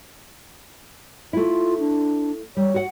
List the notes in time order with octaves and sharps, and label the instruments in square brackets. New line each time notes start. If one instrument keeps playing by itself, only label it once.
[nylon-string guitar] A3 E4 [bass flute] F4
[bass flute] D4
[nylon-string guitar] G3 [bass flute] C#5
[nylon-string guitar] F#4 F#5